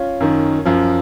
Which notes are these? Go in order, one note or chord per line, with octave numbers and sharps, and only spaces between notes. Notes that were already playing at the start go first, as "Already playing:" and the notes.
Already playing: C#4 F4
F#2 D#3
F#2 F3